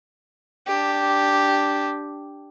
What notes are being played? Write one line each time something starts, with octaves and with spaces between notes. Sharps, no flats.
D4 G4